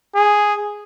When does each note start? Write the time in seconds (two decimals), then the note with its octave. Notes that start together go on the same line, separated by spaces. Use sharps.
0.15 G#4